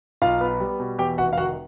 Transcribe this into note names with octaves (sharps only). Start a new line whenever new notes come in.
B1 F4 F5
B3
G3
B2
E2 G4 G5
F1 F#4 F#5
F5
D#3 F#4 F#5